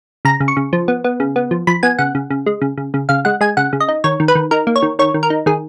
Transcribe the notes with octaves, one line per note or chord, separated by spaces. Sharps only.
C#3 A#5
C#3
C#6
C#3
F3
B3
B3
C#3
B3
F3
F3 B5
B3 G#5
C#3 F#5
C#3
C#3
G#3
C#3
C#3
C#3
C#3 F5
G#3 F#5
G#3 G#5
C#3 F#5
C#3
D#5
D#4
D#3 C#5
D#3
B4
D#3
D#4 A#4
A#3
C#5
D#3
D#3 C#5
D#3
A#4
D#4
D#3 G#4